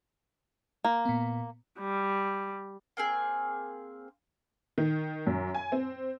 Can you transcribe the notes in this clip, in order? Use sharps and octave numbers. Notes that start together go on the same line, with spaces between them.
A#3
A#2 B3
G3
A#3 C4 G#4
D#3
F#2
G#5
C4